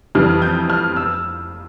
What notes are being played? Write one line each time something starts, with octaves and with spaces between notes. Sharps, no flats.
F2 E3 G3 F6
G6
F6
E6